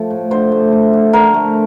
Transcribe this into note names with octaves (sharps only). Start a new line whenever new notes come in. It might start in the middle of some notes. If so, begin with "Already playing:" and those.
Already playing: F3 A3
A2
D3 C5
A3
A3
D3
D3 A#4
A3